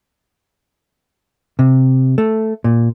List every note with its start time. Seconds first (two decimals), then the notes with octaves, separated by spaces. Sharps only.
1.59 C3
2.18 A3
2.64 A#2